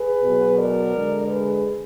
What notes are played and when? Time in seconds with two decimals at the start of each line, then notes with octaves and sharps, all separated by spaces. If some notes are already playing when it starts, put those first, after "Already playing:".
Already playing: G#4 B4
0.23 B2 F#3
0.58 A#4 D5
0.93 D3 G#3
1.28 G#4 B4